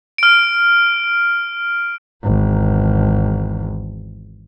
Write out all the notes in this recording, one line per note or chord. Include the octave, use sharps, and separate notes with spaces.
F6 D7
G#1 E2